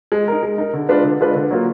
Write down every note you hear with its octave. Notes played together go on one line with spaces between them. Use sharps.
G#3
D#4 A#4
G#3
D#4 A#4
D3
G#3 D4 F4 B4
D3
G#3 D4 F4 B4
D3
F#3 A#3 F4